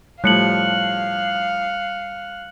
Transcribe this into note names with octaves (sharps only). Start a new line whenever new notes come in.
A2 F3 G3 F5 F#6 C#7 F#7